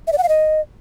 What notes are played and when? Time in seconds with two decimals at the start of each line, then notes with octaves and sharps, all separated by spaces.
0.07 E5
0.13 D5
0.18 F#5
0.23 F5
0.29 D#5